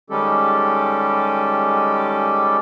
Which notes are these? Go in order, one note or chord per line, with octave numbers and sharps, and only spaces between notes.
D#3 G3 G#3 C#4 G4 A4